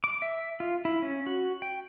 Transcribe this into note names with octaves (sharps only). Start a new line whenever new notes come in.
D6
E5
F4
E4
C#4
F#4
G5